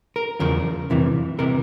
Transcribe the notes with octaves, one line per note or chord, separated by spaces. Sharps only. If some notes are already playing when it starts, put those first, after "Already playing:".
A#4
E2 C#3 F3 A#4
F2 C3 E3
C3 E3 A#4